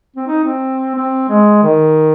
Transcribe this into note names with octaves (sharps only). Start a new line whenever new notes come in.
C4
D#4
C4
C4
G#3
D#3